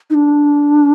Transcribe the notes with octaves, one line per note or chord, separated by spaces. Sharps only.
D#4
D4